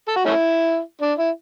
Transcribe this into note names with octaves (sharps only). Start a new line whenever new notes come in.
A4
F#4
A3 C#4 E4
D4
E4